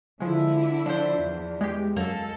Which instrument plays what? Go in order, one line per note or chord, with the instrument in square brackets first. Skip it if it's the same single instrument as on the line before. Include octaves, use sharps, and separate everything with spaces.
[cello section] D3 E4 [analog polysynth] F3 G#3
[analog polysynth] F3 [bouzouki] D4 C5
[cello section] E2
[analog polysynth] G#3 G4
[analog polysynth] F#2 [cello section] G#3 A4 [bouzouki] A#3